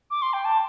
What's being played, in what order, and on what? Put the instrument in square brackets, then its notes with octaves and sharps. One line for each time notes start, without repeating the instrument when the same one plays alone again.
[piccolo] D6
C6
G5
A5